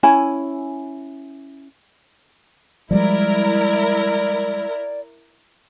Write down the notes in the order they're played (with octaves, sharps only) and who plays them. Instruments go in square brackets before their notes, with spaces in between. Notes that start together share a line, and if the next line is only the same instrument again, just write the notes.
[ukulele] C#4 E4 G#5
[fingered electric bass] F3 G3 G#3 [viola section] E4 A#4 [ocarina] D5